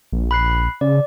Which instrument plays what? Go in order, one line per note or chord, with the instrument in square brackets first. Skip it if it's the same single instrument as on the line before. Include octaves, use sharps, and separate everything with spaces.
[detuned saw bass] A#1
[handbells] B5 F#6 C7
[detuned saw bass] C#3 [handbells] D5